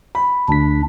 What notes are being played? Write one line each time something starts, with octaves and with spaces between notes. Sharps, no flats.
B5
D2 D4 B6